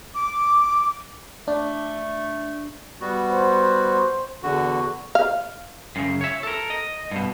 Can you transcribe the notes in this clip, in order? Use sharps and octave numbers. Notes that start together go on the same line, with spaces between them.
D6
A3 D4
G3 B3 F#4
C5
E2 D3 F#4
F5
F#2 C#3
C#5 E5
A4 A#4
D#5
G2 B2